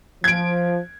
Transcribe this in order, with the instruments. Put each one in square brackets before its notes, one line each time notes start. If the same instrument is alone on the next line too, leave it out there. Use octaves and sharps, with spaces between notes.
[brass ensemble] F3 [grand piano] G#6 D7